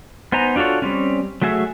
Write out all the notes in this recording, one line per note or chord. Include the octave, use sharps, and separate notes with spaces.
B3 D#4 C5 G#5 A#5
D4 F4 F#4 A4 C#5
G3 C4 C#4
F#3 A3 F#4 G#4 E5